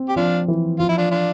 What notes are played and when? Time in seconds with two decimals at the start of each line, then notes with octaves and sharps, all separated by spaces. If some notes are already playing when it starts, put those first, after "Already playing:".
Already playing: C4
0.09 G4
0.16 F3 D4 F4
0.48 E3
0.79 F3 F4
0.89 E4
0.98 D4 F4
1.11 D4 F4